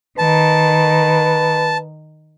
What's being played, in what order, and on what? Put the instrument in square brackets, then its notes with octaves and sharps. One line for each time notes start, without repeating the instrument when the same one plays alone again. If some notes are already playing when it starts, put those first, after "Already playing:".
[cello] D#3 [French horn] B4 [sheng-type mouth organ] A5